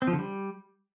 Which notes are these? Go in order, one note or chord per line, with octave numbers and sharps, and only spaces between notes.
C4
F3
D3
G3